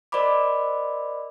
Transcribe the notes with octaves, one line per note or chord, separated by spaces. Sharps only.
A#4 C5 D5 D#5 B5 D6